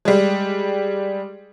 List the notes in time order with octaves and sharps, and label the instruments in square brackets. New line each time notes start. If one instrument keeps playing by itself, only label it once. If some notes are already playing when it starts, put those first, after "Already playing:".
[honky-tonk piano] G3 G#3